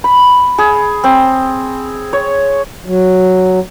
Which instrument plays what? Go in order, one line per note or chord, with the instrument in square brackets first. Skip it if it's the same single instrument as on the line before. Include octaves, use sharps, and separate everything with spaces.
[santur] B5
G#4
C4
C#5
[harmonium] F#3